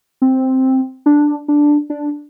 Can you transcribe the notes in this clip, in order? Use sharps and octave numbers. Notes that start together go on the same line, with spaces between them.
C4
D4
D4
D4